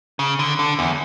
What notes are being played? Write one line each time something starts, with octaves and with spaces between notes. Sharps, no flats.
C#3
D3
D3
E2